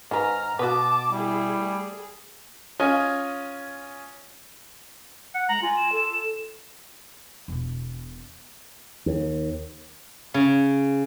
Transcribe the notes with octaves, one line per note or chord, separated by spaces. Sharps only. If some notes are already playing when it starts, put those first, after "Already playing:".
G#2 D#3 B4 A#5 F6
B2 B3 F#4 B4 A5 D6
G3 E4 G#4
A3 G#4
C#4 F4 D#5 G#5
F#5 C#7
G#3 A#5 F#7
F4 G#5
E7
A4
E1 B2
D#2
C#3